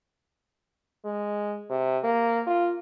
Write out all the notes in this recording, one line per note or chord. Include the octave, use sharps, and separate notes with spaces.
G#3
C3
A#3
F4